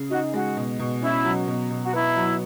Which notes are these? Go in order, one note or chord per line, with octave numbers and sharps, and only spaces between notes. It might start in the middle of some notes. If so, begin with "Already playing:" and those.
Already playing: C#3 G#4
D#4 F#4
G#3 F#4
B2
B2
C#4 E4
F#3
B2
B2
F#4
B3 E4
F#3